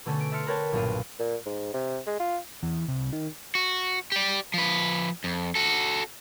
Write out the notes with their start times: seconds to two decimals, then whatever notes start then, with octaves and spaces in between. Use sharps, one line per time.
0.06 B2 D3 A3 C#4 A4
0.20 D7
0.32 E5 A5 C6 F6 C#7
0.47 A#4 B4 C#5 G5 A5
0.72 B1 G2 A#2 D4 F5 D#7
1.19 A#2
1.46 G#2
1.74 C3
2.07 G#3
2.20 F4
2.62 E2
2.88 C2
3.13 D#3
3.55 F#4
4.12 G4 D5
4.54 F3 B4
5.24 F2
5.55 F#4 A4